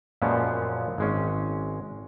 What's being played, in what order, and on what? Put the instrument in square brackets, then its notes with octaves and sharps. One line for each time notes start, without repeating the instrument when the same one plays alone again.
[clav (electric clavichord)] F#2 A#2 F3 G#3 B3 C#4
G#1 G#3 C#4